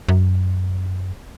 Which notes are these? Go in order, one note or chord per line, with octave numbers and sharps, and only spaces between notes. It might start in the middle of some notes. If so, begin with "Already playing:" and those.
F#2